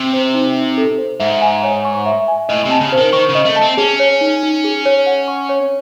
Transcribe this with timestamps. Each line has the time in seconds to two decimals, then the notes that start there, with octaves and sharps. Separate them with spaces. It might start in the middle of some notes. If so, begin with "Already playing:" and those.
Already playing: C3
0.13 C5
0.34 D#4
0.55 D#4
0.77 A4
0.98 C5
1.20 G#2 E5
1.41 G#5
1.63 C#5
1.85 C#6
2.06 E5
2.28 G#5
2.49 A2 D#5
2.65 C3
2.71 A5
2.81 C#3
2.92 C5
2.98 D#3
3.13 D#3 C#6
3.30 C#3
3.35 D#5
3.46 A3
3.56 A5
3.62 C4
3.77 C#4 G#4
4.00 C#5
4.21 D#4
4.43 D#4
4.64 G#4
4.85 C#5
5.07 F#5
5.28 C#6
5.49 C#5